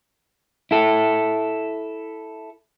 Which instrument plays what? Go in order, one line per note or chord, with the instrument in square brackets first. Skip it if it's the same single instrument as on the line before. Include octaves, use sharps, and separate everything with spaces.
[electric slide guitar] E4 A4